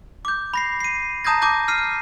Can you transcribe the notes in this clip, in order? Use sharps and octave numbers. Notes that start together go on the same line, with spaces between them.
D6 G6
B5 A#6 C7
C7 D#7
A5 A#5 D#6 G6 G#6 A#6
A5 D6 D#6 G6 A#6
F6 C7 D#7